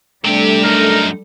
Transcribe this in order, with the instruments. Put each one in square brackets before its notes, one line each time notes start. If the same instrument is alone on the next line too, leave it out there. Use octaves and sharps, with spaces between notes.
[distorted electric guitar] C3 G4 [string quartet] G3 A4 [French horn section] A3 D4
[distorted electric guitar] F#2 D#4 [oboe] A#4